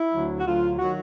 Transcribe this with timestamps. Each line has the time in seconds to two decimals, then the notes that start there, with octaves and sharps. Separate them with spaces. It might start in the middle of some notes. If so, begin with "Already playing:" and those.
Already playing: E4
0.13 D2 D3 F#3
0.37 F#4
0.46 D2 D3 F#3 F4
0.79 D#3 F#3 F#4